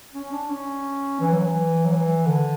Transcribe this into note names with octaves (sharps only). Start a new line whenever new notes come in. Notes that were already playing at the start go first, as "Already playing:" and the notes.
C#4
D4
C#4
E3
F#3
E3
F#3
E3
D3